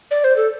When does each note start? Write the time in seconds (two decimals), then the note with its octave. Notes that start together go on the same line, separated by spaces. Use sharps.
0.11 D5
0.24 C5
0.36 A4